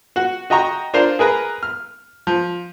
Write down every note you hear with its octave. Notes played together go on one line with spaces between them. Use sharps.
F#4 F#5
F#4 D#5 G5 A#5 C#6
D4 F4 A#4 C5
G#4 A#4 B4 A#5
F6
F3